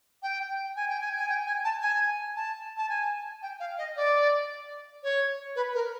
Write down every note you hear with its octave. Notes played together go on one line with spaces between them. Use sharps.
G5
G#5
G5
G#5
G#5
G5
G#5
A5
G#5
A5
A5
G#5
G5
F5
D#5
D5
C#5
B4
A#4